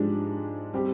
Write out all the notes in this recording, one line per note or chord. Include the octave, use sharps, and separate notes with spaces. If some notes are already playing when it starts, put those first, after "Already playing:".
Already playing: G#2 F3 G#3 D4 G4
G3 C4 G4